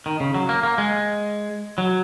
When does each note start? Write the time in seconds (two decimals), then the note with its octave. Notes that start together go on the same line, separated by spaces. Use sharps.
0.06 D#3
0.20 C#3
0.35 F#3
0.49 A#3
0.63 A#3
0.78 G#3
1.78 F#3